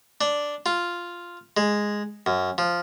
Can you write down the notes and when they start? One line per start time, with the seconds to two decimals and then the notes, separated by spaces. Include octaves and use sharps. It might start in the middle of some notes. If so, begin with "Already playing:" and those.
0.21 D4
0.66 F4
1.57 G#3
2.26 F#2
2.58 F3